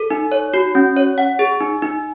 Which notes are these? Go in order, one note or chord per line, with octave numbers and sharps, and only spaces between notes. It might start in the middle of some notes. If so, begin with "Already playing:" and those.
Already playing: A4
D#4
C#5
F#4
C#4
C#5
F#5
G#4
D#4
D#4